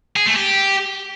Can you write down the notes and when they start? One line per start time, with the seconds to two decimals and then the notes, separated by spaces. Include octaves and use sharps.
0.16 G#4
0.26 A3
0.36 G4